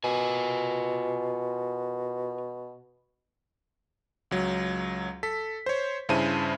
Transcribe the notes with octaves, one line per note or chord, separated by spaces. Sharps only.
B2 F4 A#4 G#5
C#2 F#3
A4 B6
C5 C#5
G2 C#3 E4 C5 A5 D#7